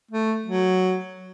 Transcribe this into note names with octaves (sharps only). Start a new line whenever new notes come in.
A3
F#3